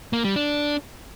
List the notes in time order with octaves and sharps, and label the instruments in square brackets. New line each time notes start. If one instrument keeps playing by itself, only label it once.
[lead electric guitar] A#3
G3
D4